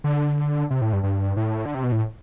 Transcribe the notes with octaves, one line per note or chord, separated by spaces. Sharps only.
D3
C3
A2
G2
G2
A2
D3
C3
B2
A2